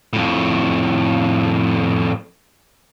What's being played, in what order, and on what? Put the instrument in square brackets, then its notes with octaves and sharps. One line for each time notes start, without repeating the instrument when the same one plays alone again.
[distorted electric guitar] F2 A2